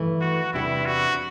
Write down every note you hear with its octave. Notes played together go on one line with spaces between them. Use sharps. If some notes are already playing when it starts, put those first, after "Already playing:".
Already playing: G2 E3 A3
F#4
E2 C3 G3 D4 E4 G4
F#4